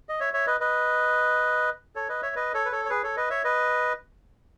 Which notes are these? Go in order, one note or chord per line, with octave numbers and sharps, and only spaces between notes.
D#5
C#5 E5
C#5 E5
B4 D#5
B4 D#5
A4 C#5
B4 D#5
C#5 E5
B4 D#5
A4 C#5
B4
A4 C#5
C#5
G#4 B4
A4 C#5
B4 D#5
C#5 E5
B4 D#5